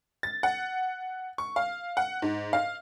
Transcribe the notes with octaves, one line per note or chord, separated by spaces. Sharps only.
A6
F#5
C#6
F5
F#5
G#2
F5